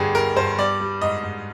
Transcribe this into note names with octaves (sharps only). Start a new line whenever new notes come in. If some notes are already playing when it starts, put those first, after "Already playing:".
Already playing: D2 G2 D3 G4 G#4
G3 A#4
G2 C5
G3 D5
G3
G#2 D#5
G#2